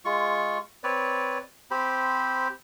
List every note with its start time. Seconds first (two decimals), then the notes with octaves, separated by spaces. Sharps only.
0.05 G#3 F4 C#6
0.84 C4 B4 C#5 D5
1.71 C4 G4 C5 B5